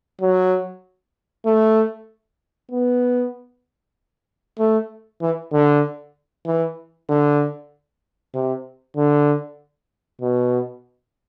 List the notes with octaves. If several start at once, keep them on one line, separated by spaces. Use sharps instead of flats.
F#3
A3
B3
A3
E3
D3
E3
D3
C3
D3
B2